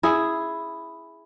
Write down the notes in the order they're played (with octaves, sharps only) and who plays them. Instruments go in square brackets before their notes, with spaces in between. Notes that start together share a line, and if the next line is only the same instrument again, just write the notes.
[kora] E4 G#4